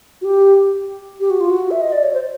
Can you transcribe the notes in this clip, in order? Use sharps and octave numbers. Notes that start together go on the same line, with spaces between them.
F#4
G4
G4
F#4
F4
F#4
E5
D#5
D5
C#5
C5